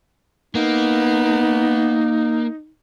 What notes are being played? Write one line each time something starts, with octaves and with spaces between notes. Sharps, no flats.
A#3 B3 D#4